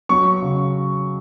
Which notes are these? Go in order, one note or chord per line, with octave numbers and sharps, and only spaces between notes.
F#3 C#6
C#3